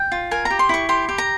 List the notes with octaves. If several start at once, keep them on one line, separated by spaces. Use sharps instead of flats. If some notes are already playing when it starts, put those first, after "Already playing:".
Already playing: G5
F4
A#4 G#5
A#5
G4
C6
E4 C#6
G4 C6
G4
A#5